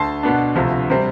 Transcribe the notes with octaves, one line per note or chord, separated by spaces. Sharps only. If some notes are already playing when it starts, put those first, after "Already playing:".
Already playing: D2 A5 C6
B2 B3 D4
D2 C3 F3
C3 G3 C4